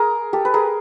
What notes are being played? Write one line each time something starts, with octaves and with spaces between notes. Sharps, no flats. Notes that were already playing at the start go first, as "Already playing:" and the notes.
Already playing: G#4 A#4
G4 A4
B4
G#4 A#4